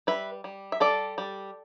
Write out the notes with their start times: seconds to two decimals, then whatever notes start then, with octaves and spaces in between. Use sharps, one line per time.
0.07 G3 B4 E5
0.44 G3
0.72 E5
0.80 G3 A4 D5
1.18 G3